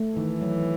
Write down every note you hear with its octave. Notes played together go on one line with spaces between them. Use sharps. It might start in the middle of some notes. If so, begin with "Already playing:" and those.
Already playing: A3
D#3 E3
F#3